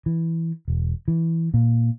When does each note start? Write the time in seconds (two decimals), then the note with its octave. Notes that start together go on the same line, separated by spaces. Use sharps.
0.06 E3
0.68 E1
1.08 E3
1.54 A#2